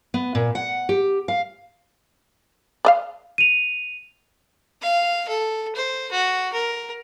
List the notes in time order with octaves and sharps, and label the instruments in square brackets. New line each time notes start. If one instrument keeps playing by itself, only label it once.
[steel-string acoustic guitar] B3
A#2
F#5
G4
F5
[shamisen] D5 D#5 F5
[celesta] D#7 F7
[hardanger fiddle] F5
A4
C5
F#4
A#4